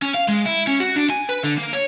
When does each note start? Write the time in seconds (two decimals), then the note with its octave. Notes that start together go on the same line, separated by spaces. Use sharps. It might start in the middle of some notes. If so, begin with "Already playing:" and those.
0.02 C#4
0.14 F5
0.29 G#3
0.46 E4
0.67 C#4
0.80 F#4
0.96 D4
1.10 G#5
1.29 B4
1.43 D3
1.58 A#3
1.73 C#5